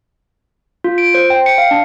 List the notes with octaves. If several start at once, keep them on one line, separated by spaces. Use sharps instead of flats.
F4
D7
C5
G5
C#7
F5
D4